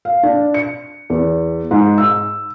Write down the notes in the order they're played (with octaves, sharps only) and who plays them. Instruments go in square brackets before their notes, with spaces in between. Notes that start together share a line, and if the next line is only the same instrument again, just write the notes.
[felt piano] F5
D4
C#7
E2
G#2
E6